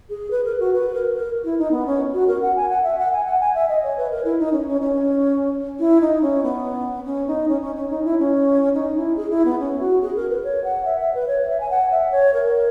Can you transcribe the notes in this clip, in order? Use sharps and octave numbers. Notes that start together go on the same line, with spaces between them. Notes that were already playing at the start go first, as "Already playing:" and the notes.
G#4
B4
A#4
F#4
B4
A#4
A#4
E4
D#4
B3
C#4
F#4
A#4
F#5
G#5
F#5
E5
F#5
G#5
F#5
G#5
E5
D#5
C#5
B4
A#4
E4
D#4
C#4
C#4
C#4
E4
D#4
C#4
B3
C#4
D#4
C#4
C#4
C#4
D#4
E4
C#4
D#4
E4
G#4
E4
B3
C#4
F#4
G#4
A#4
B4
C#5
F#5
E5
E5
B4
C#5
E5
G#5
F#5
E5
C#5
A#4